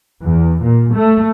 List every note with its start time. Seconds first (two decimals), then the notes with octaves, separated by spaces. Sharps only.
0.23 E2
0.62 A#2
0.94 A3